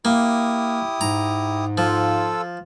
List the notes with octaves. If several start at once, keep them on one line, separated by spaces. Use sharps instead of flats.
A#3 E4 G4 D#6
G#2 A#5
F3 F4 A4 E6